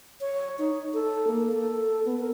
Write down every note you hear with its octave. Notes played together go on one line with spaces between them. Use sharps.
C#5
D#4
A4
A#3
A4
B3
A#4